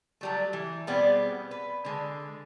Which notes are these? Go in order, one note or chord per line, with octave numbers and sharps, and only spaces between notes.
F#3 G3 A3
E3
B2 G3 B3 C4 G#4 D5
B4
D3 G#3